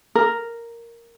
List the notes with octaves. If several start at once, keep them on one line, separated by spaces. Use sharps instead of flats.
A#4